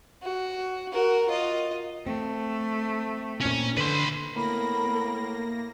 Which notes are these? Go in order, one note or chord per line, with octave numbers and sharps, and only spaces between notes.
F#4
F#4 A#4
F4 D#5
A3 C4
A#2 C4 C#4
D3 B4 C6
A2 A#3 B3 A#4 B5 A#6